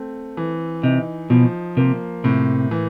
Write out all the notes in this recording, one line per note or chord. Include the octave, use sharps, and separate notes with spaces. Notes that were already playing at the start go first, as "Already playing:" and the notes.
Already playing: A3 C4
E3
C3 D#4
B2 F3
C3 A#3
A2 C3
E3